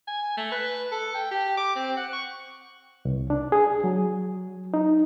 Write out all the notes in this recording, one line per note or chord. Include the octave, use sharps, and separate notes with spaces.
G#5
A3
B4
A4
G5
G4
D6
C4
F#5
C#6
C2
D4
G#4
F#3
D#4